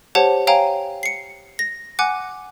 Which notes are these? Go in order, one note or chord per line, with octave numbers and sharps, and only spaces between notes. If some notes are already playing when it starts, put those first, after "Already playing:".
G4 C5 C#5 F#5 A5
C#5 F5 G5 G#5 A#5
C7 C#7
A#6
F#5 G#5 D6 F#6